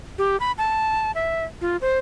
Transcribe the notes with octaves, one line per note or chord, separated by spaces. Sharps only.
G4
B5
A5
E5
F4
C5